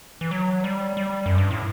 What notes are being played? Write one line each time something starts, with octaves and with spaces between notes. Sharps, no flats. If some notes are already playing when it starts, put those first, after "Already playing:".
E3
F#3
G3
G3
F#2
G2
A2